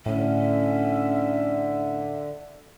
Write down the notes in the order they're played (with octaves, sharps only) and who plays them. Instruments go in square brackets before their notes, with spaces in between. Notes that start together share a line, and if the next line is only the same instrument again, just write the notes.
[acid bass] A2 [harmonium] D3 [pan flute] C#4 [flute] E5